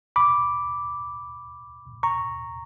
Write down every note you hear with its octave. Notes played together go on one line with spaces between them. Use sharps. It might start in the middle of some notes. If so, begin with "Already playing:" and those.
B5 D6
A#5 C#6